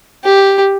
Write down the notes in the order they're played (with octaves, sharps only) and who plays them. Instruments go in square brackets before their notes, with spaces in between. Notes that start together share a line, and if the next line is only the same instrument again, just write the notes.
[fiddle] G4